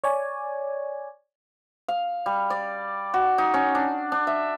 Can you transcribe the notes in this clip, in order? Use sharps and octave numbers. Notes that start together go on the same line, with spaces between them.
C#5 D5 G#5
F5
G3
D5
F#4
D#4
C#4
D4
D4
E5